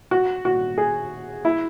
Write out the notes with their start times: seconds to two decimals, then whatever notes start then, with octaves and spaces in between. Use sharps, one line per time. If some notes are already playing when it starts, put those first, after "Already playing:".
0.11 F#4
0.45 F#4
0.78 G#4
1.45 E4